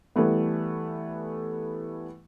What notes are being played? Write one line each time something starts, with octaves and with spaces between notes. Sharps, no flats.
E3 G3 A3 B3